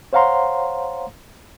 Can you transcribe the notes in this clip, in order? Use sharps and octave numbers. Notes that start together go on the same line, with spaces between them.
C5 C#5 F5 F#5 A#5 C6